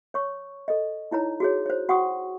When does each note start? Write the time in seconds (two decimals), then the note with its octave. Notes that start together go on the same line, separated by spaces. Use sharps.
0.14 C#5 C#6
0.68 A4 D#5
1.11 D#4 E4 C#5 A#5
1.40 F#4 G#4 C#5
1.66 C5 C#5
1.89 F#4 F#5 G5 C#6 D#6